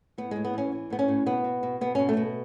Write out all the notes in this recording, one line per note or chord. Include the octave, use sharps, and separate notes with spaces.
A2 B3
A2 G#3
B3
E3 C#4
E3
A2 B3
C#4
A2
B2 B3
B2
B2
B2 B3
B2 C#4
A3
B2